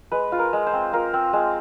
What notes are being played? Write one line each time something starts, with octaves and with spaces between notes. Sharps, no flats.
G#3 B4
F4
A#4
G#3
C5
C4
F4 A#4
C4
G#3